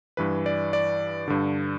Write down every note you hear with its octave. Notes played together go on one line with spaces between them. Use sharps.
G2 E3 B4
D5
D5
G2 D3